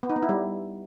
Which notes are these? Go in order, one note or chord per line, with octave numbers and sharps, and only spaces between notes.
B3
D#4
B3
E4
G3